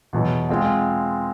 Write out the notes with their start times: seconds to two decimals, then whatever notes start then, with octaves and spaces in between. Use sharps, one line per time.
0.13 E2 B2 F#3
0.49 G#3 C4 F4